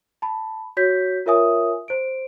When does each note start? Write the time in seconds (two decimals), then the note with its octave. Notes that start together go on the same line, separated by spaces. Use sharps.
0.22 A5 B5
0.77 F#4 C#5 G6 B6
1.26 F4 A#4 C#5 E5 G#5 D#6
1.88 C5 D7